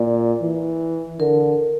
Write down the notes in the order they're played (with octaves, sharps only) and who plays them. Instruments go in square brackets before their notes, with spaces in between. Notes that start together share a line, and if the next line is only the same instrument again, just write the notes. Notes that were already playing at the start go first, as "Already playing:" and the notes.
Already playing: [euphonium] A#2 [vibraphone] D5
[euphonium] E3
[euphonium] D3 [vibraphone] A#4